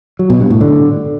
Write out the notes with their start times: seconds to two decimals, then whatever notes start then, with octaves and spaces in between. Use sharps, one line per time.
0.19 F#3
0.30 B2
0.40 G2
0.50 A2
0.61 D3